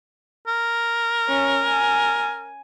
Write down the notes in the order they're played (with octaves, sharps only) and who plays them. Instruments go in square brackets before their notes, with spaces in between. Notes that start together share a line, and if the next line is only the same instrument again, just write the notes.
[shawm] A#4
[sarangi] C#4
G#5